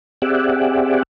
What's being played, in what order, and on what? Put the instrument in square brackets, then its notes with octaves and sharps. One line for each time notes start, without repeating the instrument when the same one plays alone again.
[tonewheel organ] C4 G4 G#4 D5 E5 F#5